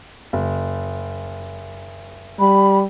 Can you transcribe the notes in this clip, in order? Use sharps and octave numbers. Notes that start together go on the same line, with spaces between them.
F#1
G3 B5